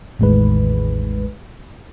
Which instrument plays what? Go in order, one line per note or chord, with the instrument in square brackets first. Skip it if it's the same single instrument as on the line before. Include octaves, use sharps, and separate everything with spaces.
[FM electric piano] A1 E2 A2 D#3 G#3 B4